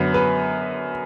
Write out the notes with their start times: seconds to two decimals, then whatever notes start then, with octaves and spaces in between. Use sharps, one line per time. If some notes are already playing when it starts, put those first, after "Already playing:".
Already playing: F#2 D3 F#3 B3
0.14 B4